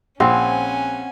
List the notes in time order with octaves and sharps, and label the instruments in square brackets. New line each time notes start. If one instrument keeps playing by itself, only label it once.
[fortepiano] A#1 [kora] C4 [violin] C#4 G#5 [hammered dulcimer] F#5